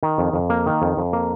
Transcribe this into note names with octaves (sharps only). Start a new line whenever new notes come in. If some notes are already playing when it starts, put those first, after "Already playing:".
D#3
F2
F2
A#3
D#3
F2
F2
A#3